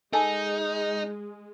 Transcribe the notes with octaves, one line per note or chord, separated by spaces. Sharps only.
G#3 D#4 A4 G#5 A5